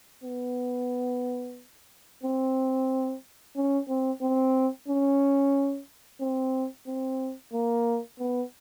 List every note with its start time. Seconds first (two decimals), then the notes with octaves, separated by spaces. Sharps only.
0.24 B3
2.23 C4
3.56 C#4
3.89 C4
4.22 C4
4.88 C#4
6.21 C4
6.87 C4
7.53 A#3
8.19 B3